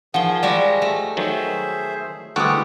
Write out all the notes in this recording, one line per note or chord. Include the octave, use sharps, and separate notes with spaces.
D#3 F3 G#4 F#5 G7
F3 G3 G#3 F#4 D5
A3
D#3 F#3 G#4 C5 E5
D2 E3 G3 G#3 A4 F#5 C#6 D#6